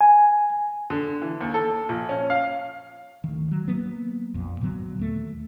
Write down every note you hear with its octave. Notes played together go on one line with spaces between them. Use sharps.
G#5
D3
E3
D#2
A4
A#1
C#4
F5
D2 D#3
F#3
F#3 A#3 B3
A#1 F2
A#2 D3 F#3 B3
D#2 A3